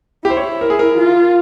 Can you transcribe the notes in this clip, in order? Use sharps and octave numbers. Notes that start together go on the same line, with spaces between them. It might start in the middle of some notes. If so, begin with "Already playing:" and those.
E4 G4
C5
C#5
A#4
G#4
A#4
F4